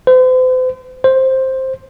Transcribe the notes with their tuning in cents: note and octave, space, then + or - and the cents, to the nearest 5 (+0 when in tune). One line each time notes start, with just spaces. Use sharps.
C5 -40
C5 +10